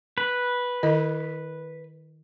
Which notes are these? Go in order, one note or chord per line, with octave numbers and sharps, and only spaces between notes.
B4
D#3 E4 D#5